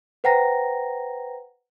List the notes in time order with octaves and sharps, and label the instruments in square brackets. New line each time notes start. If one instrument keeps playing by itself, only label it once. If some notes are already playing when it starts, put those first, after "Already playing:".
[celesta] B4 C5 F#5 G5 A#5 A#6